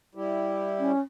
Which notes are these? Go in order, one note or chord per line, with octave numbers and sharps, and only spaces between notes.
G3 E4 G4
C#4